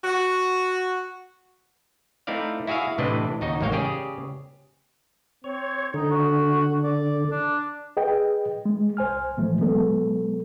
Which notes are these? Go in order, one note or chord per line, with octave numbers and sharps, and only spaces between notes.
F#4
A3 C4 D#4 E4 D5 F5
E4 F#4 G#4 E5 F5
A2 C3 E3 D4 B4 D#5
D#2 C#3 D#4 F#4 D#5
A1 G#2 A#3 C#5 F5 G5
C#3 G4 G#4 D5
C4 C#5
D3 D#4
F#4
D5
D4
G#4 B4 D#5 G5
G#3
C2 C5 G#5 F6
A2 E3 F3 A3
B2 F#3 G#3 B3 A4